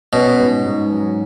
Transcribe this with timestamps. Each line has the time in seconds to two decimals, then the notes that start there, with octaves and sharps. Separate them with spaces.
0.13 B2 C#4
0.39 G#2
0.66 G#2
0.92 F#3